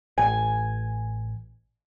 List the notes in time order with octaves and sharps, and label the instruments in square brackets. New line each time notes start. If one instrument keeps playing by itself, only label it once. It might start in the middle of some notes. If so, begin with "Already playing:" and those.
[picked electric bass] A1 [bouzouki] G#5